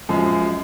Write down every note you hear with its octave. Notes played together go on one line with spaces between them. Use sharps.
F#2 F3 G#3